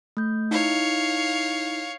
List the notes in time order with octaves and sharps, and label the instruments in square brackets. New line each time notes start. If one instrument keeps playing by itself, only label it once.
[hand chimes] A3 G6
[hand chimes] D#4 E4 [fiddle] C#5 F5